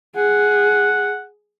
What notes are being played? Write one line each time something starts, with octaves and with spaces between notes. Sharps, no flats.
G#4 F#5